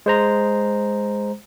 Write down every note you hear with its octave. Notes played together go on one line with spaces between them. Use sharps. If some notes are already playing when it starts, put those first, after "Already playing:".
G#3 C5 A#5